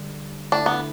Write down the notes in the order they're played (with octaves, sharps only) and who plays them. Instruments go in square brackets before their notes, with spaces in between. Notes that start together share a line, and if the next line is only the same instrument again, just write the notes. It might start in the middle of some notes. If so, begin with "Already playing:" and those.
Already playing: [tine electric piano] D3 G3 D4
[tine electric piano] D3 A3 E4 [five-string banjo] D4
[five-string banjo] B3